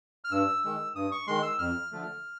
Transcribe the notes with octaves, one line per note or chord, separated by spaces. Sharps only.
F6
G2 E6
D#3 G#3
G2 D#6
C#6
D#3 G#3 C6
E6
F2 F6
D3 F3 A3